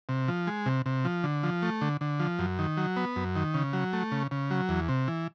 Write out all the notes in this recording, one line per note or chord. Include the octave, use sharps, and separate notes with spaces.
C3
F3
G#3
C3
C3
F3
D3
F3
A3
D3
D3
F3
F#2
D#3
F#3
B3
F#2
D#3
C#3
F#3
A3
C#3
C#3
F#3
E2
C3
E3